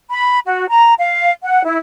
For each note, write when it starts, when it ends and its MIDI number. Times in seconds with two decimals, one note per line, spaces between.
0.09 0.40 83
0.45 0.67 66
0.70 0.94 82
0.98 1.31 77
1.44 1.64 78
1.65 1.77 64